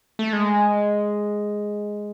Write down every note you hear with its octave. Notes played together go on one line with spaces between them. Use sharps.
A3
G#3